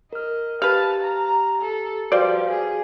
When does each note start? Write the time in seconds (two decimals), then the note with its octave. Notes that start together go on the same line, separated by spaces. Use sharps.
0.13 A#4 D#5 F6
0.62 G4 B4 F5 A5
1.03 A#5
1.62 A4
2.12 F3 G3 F#4 B4 C5 D5 F5
2.50 G#4